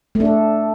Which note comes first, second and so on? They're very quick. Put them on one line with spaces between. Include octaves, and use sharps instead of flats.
A3 D4 A4